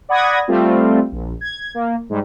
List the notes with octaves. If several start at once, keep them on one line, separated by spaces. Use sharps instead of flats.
D5 F#5 B5 D#6 G#6 A#6
G3 A3 C4 F4
A#1
G#6
A#3
G#2 G3